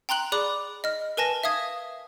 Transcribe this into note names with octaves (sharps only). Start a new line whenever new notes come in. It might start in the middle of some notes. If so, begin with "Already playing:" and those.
G5 A#5 C6 F#6 F#7
G#4 D5 B5 D6 F#6
D#5 F6
A#4 B4 G#5 A5 A#6
E5 F5 D#6 G#6